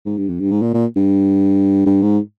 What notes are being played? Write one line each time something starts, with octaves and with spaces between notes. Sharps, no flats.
G#2
G2
F2
G2
G#2
A#2
A#2
G2
G2
G#2